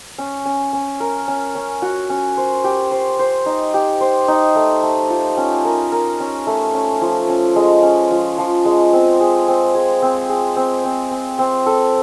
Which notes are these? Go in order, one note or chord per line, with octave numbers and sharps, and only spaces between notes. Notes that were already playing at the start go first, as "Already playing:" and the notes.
C#4
C#4
C#4
A#4
C#4
C#4
F#4
C#4
C5
G4
C5
C5
D#4
G4
C5
D#4
A3
A3
F4
C#4
A#4
A#4
C#4
A3
C#4
F3
C#4
G#3
C#4
F3
F3
G#3
C4
G#4
C4
G#4
C4
G#4
C4
C4
C4
C4
A4